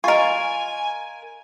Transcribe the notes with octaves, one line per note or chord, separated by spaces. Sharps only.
F4 A#4 D#5 G#5 C#6